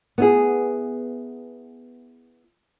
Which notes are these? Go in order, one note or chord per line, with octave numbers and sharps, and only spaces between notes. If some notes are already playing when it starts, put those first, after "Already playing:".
B3 E4 G#4